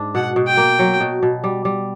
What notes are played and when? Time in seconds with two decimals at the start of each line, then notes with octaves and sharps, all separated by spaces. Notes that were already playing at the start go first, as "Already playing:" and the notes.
Already playing: G#2 D4
0.15 B2 F#5
0.36 B2
0.47 G5
0.57 A#3
0.79 F#3
1.00 B2
1.23 B2
1.44 G3
1.65 G3